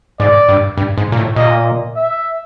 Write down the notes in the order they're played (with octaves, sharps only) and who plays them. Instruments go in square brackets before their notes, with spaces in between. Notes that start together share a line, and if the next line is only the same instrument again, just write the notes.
[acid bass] G#2 [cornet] D5
[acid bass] G2
G2
G#2
A#2
A2
[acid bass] A#2 [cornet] D#5
[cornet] E5